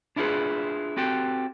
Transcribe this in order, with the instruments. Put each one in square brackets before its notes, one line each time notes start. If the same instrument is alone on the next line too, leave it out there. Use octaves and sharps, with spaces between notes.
[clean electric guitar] D4 E4 F4 G4 G#4 B4
C4 F#4 G4 A4